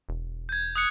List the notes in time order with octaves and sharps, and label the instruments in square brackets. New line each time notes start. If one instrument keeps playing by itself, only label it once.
[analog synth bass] E1
[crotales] G6 G#6
D#6 F#6 C#7